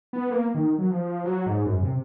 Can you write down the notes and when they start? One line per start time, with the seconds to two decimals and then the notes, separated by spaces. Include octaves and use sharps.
0.13 B3
0.31 A#3
0.55 D#3
0.78 F#3
0.90 F3
1.25 F#3
1.46 G#2
1.65 F#2
1.83 C3